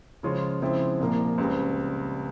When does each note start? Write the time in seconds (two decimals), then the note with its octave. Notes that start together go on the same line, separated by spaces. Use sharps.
0.23 C#3 F3 G#3 C#4 F4
0.62 C#3 F3 G#3 C4 E4
0.99 C2 A#2 F3 A#3
1.38 C#2 C#3 G3 C4